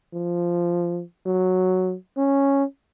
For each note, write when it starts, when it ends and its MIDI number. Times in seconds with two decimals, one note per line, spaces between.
0.14 1.02 53
1.26 1.95 54
2.17 2.64 61